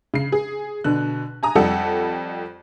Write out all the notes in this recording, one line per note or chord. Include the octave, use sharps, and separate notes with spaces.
C#3 C7
G#4
B2 D3 F#6
G#5 A#5 D#6
F2 G3 A4 F#5 E6